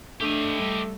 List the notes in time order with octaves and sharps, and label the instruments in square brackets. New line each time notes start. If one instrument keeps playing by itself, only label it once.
[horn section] A3 [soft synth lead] D4 [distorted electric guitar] G4 D#5
[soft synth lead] G3